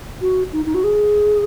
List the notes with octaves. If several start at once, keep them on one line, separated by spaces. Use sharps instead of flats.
F#4
D#4
D#4
F#4
G#4